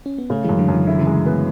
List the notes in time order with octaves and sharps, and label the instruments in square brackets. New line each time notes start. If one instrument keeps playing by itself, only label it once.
[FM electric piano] C#4
B3
[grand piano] C#3 [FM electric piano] A3
[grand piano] F#2 [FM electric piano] E3 G#3
[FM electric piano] D3 F#3
[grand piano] F#2
[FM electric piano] E3
[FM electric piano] D3 [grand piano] E4
[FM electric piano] C#3 E3
[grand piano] G#3
B3